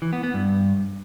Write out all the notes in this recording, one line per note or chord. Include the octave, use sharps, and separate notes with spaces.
E3
B3
B3
G2